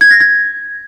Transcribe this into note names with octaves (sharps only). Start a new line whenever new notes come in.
G#6
A#6
G#6